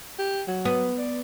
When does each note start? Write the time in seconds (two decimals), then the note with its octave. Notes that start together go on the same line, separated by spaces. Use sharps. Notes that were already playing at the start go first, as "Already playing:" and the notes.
0.19 G4
0.48 F#3
0.65 B3
0.98 D5